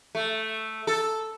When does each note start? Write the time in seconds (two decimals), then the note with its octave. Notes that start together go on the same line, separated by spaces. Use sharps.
0.15 A3
0.87 A4